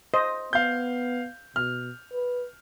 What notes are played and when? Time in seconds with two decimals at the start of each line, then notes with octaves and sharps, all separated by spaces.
0.14 C5 D#5
0.53 B3 F5 G6
1.56 B2 F6
2.13 B4